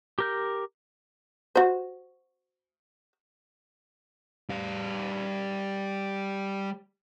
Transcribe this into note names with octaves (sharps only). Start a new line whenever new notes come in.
G4 A#4 G6
F#4 C5
G3 F5